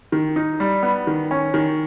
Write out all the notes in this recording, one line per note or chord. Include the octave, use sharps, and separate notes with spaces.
D#3
D#4
G3
B3
D#3
C#4
D#3